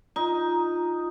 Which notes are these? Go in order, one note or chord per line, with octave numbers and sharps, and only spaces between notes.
D#4 F4